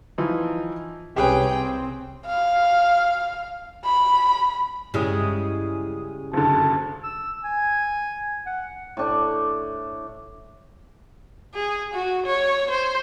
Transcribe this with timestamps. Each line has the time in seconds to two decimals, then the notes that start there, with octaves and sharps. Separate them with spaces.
0.18 E3 F3 D#4
1.16 C2 C#4 G4 G#4 B4 G5
1.55 C4
2.26 F5
3.85 B5
4.94 G2 C#3 G3 G#3 E4 D#6
6.34 F#1 D3 A5
7.03 E6
7.44 G#5
8.46 F#5
8.97 A2 D4 C#6
11.54 G#4
11.93 F#4
12.26 C#5
12.71 C5